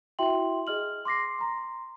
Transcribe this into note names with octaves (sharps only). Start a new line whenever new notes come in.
E4 F#4 E5 G5 C6 F#7
G#4 D#5 F6 F#7
C6 D6 A#6 C7
A#5 C6